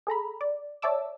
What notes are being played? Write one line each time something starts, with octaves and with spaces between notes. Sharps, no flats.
G#4 A4 A#5 B5
D5
C#5 D5 E5 A5 D6 E6